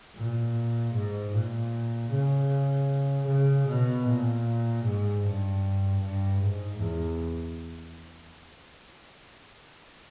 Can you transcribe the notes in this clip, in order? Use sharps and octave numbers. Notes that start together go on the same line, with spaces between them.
A#2
G#2
A#2
C#3
C#3
B2
A#2
G#2
G2
G2
G#2
E2